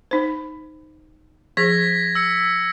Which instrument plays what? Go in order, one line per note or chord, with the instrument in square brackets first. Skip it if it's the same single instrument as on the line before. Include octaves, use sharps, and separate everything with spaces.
[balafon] D#4 C5
[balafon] F3 G#4 [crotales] G#6 A#6 B6
[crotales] E6 C#7